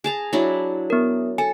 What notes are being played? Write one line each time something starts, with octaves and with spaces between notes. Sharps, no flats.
G#4 A5 A#5
F#3 D4 E4
B3 A#4
A4 G#5